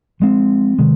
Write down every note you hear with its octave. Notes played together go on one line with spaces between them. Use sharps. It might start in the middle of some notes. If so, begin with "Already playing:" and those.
F3 G#3 C4
C3 D#3 G#3